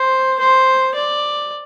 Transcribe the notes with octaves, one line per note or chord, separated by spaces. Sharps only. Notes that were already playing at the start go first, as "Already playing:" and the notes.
Already playing: C5
C5
D5